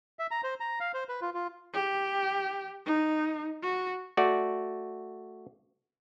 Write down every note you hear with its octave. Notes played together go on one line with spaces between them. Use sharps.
E5
A#5
C5
A#5
F5
C5
B4
F4
F4
G4
D#4
F#4
A3 F#4 D5